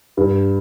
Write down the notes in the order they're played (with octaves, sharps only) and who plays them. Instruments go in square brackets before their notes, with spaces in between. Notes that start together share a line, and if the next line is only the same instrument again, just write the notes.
[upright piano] G2